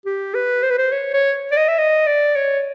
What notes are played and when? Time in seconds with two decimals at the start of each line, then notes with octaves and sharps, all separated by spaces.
0.06 G4
0.35 B4
0.63 C5
0.70 B4
0.78 C5
0.92 C#5
1.14 C#5
1.51 D5
1.57 D#5
1.68 E5
1.78 D#5
2.07 D5
2.36 C#5